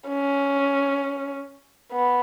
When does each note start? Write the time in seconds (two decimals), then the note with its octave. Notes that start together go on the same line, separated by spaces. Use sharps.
0.08 C#4
1.92 B3